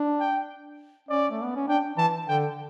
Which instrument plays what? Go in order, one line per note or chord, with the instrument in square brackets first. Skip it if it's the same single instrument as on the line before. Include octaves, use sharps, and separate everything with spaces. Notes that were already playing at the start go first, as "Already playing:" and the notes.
Already playing: [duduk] D4
[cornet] G5
[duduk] C#4 [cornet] D5
[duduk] A3
B3
C#4
[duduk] D4 [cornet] G5
[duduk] E3 [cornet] A5
[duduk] D3 [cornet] G5